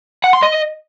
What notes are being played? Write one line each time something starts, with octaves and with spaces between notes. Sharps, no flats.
F#5
C6
D#5